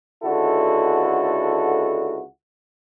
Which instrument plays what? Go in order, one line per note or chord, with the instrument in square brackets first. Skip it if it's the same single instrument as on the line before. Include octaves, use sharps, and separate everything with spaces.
[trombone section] C#2 D3 E4 F#4 A4